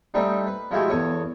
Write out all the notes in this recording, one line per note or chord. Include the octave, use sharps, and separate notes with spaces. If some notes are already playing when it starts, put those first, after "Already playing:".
G3 A3 C4 D4 D#4
B4
F3 G#3 A3 E4 F#4 G4
E2 A4 C#5 D#6